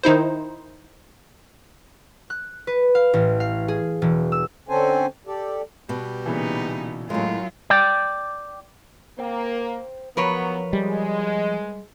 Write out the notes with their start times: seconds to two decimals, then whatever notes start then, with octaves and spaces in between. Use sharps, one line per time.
0.03 D#3 D#4 E4 C5
2.30 F#6
2.67 B4
2.95 F5
3.13 A1
3.40 F5
3.68 G#4
4.02 E1
4.32 E6
4.69 D3 C4 C#4 A4 C5 G#5
5.27 G4 A4 D5
5.89 B2 G3
6.26 A#2 C#3 E3 B3 D#4
7.10 F#2 A2 F#3 G#3 F4
7.70 D5 G5
9.19 A#3 C5 G5
10.17 F3 F#3 B3 A#4 B4 C#5
10.73 G3 G#3